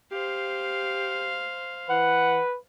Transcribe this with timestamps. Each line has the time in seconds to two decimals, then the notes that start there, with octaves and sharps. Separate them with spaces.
0.11 G4 C5 F5
1.90 E3 B4 F#5